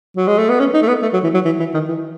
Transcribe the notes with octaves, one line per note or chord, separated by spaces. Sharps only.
F#3
G#3
A3
B3
C#4
D#4
A3
B3
A3
F#3
E3
F#3
E3
E3
D#3
E3